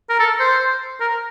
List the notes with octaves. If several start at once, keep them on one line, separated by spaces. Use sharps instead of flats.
A#4
A4
C5
A#4